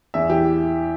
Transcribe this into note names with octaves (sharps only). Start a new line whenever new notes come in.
E2 E5
E3 G4